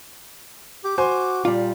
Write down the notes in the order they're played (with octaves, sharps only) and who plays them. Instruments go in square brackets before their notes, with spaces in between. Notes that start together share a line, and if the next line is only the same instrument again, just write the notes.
[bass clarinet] G4 [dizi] D6
[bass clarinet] F#4 [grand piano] C5 G#5 C6
[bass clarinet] A#2 [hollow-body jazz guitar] G3 F4